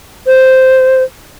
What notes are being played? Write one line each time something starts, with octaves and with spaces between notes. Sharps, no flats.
C5